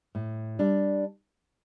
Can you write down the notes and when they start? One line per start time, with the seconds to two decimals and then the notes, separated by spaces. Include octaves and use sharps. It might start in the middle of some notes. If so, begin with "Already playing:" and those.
0.15 A2
0.59 G3 D4 G4